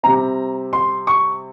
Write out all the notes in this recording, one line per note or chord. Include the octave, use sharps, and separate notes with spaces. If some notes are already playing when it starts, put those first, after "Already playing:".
C3 G3 C4 A#5
C6
C#6